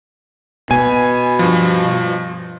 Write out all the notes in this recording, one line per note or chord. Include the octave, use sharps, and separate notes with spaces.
B2 G#5
G2 F3